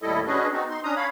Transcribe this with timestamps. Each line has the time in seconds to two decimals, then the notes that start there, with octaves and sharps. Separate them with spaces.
0.02 D#2 A2 G3 E4 A4 D#5
0.27 C#4 D4 F#4 G#4 B4 D#5
0.53 B3 C4 D#4 F#4
0.70 D#4 C6
0.84 C#4 D4 A#5 D#6
0.96 C#5 F5 B5